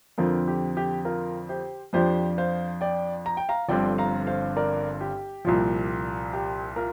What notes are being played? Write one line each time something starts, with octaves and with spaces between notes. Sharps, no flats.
F2 D3 F3 C4 F4 A#4
G4
G4
F4 A#4
G4 C5
F2 F3 D4 G4 C5
C5 F5
D5 G5
A#5
G5
F5 A#5
G1 G2 D3 F3 C4 D5 G5
F5 A#5
C5 F5
A#4 D5
G4
C2 A#2 F3
G4
F4 A#4